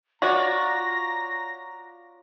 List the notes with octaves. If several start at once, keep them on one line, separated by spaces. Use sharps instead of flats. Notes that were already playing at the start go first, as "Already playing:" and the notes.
F4 F#4 C#5 D5 A#5 A#6